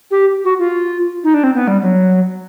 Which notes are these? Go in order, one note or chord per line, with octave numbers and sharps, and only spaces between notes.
G4
F#4
F4
D#4
D4
C4
B3
G3
F#3